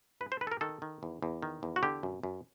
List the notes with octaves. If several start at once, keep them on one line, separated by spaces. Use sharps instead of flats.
G2 B4
C5
D#3 B4
A4
A#4
D#3 A4
D#3
E2
E2
D#3
E2
F#4
D3 G4
F#2
F#2